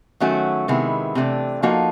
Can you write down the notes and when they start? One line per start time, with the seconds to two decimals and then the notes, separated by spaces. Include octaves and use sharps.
0.20 D#3 F#3 A3 C#4 F#4
0.68 C3 D#3 G#3 B3 E4
1.15 C3 E3 A3 D4
1.62 F3 A#3 D#4 F#4 A4